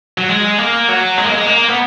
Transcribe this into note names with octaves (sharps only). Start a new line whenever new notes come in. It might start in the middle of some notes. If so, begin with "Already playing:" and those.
F#3
G#3
A#3
F#3
G#3
A#3
G#3
A#3
B3